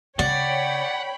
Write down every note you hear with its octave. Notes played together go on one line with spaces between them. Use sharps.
C#3 C#5 D5 F#5 G5 B5